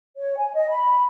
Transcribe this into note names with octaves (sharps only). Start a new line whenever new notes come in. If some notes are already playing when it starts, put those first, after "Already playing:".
C#5
G#5
D#5
B5